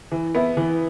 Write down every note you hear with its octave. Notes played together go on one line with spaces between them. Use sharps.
E3
B3 E4
E3